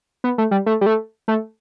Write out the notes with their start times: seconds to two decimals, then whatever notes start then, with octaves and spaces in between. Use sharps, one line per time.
0.24 B3
0.38 A3
0.51 G3
0.66 A3
0.81 G3
0.86 A3
1.28 A3